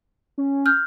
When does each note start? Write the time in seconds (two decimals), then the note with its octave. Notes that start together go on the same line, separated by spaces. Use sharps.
0.38 C#4
0.66 F6 G6